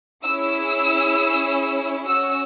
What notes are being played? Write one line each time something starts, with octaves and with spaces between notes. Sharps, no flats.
C#4 E4 G#4 E6
C#4 F#4 E6